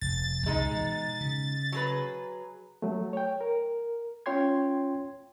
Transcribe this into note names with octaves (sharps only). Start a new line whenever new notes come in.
F1 A6
C2 G#3 D#4
B2 E3
C#3
F#3 G#4 B4
F#3 A3
C#5 G5
A#4
C#4 F4 C#5 G5 C6 G#6